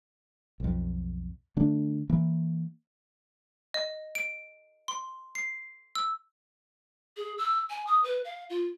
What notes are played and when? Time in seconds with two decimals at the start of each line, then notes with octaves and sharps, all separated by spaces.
0.60 B1 F2
1.57 D3 A3 D4
2.09 E3 A#3
3.74 D#5
4.15 D7
4.88 C6
5.35 C7
5.95 E6
7.17 G#4
7.38 E6
7.70 G#5
7.87 D#6
8.04 B4
8.25 F5
8.50 F4